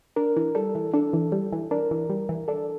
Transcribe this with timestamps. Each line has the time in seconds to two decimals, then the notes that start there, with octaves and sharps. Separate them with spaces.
0.16 D4 A#4
0.36 E3
0.55 G3 A4
0.75 E3
0.94 D4 A4
1.13 E3
1.32 G3
1.53 E3
1.71 D4 A#4
1.91 E3
2.10 G3
2.29 E3
2.48 D4 A4